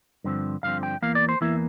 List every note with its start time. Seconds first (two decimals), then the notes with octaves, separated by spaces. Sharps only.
0.24 G2 D3 F3 C4
0.63 G2 D3 F3 C4 F5
0.83 G5
1.02 E2 E3 A#3 F5
1.15 D5
1.29 C5
1.41 E2 E3 A#3 E4